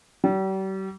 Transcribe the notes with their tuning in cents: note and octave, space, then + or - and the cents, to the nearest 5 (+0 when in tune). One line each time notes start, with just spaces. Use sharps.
G3 -40